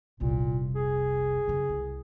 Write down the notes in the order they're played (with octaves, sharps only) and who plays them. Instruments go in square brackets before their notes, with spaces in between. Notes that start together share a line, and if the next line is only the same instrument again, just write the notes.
[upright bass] F1 C2 [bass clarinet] A#2
[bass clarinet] G#4
[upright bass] F#2 C#3
C2